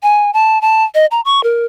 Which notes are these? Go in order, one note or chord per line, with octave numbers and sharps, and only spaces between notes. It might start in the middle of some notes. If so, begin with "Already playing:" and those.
G#5
A5
A5
D#5
A#5
C#6
A#4